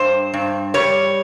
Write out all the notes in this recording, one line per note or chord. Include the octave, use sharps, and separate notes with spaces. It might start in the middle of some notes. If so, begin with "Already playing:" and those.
Already playing: G2 C5
G2
G3 C#5